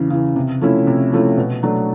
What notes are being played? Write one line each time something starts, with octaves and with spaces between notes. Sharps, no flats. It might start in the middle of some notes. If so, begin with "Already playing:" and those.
Already playing: E2 C#3 E3
C#3 E3
C3
F3 A3 C#4 E4
C3
F3 A3 C#4 E4
B2
F#3 A3 D4